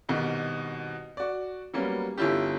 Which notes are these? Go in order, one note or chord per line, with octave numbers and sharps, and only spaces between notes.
C2 B2 D#3
F#4 D5
F#3 G3 A#3 B3 C#4
G1 C#4 E4 F4 G4